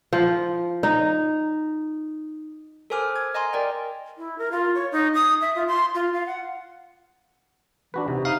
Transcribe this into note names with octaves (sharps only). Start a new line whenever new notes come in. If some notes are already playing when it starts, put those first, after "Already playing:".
F3
D#4
A4 A#4 C5 G#5 D6 F6
G#6
D#5 G#5 A#5 C6
A#4 D5 G5
E4
A#4
F4
C#5
D#4
D#6
E5
F4
C6
F4
F5
F#5
E3 D4 F#4 B4
C3 D#4
D#4 F5